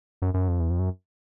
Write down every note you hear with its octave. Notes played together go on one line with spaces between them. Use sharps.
F#2
F#2
F2
E2
F2
F#2